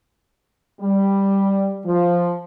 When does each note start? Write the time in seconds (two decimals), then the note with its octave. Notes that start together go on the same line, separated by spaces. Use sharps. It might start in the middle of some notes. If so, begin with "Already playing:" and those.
0.81 G3
1.86 F3